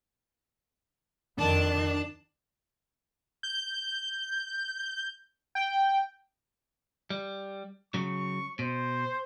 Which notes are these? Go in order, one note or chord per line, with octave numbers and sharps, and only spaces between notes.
F2 D#3 D4 A5
G6
G5
G3
C#3 F#3 C#6
B2 C5